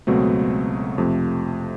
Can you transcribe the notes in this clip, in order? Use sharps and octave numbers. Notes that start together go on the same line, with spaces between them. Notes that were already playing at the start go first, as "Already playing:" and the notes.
C#2 B2 F#3 A3 C4
F2 C3 F3 A3